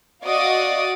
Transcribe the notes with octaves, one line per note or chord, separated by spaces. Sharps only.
F#4 D5 D#5 F5 D6 D#6